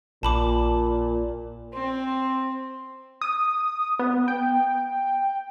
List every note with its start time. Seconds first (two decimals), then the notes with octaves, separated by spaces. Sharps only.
0.23 A#1 A#2 A5 B5 D6
1.73 C4
3.21 D#6
3.99 B3
4.28 G5